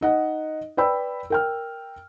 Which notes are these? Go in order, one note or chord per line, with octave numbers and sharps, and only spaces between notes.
D#4 D#5 F#5
B4 D5 G5 B5 E6
A#4 G5 F6